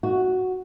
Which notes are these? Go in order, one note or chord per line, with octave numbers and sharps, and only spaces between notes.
F#4